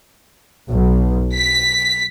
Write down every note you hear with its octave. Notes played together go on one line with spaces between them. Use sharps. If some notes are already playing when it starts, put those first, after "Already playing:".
B1
B6